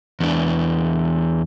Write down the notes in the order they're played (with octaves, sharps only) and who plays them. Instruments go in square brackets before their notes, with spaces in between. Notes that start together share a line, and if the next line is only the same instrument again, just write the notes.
[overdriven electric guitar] E2 D4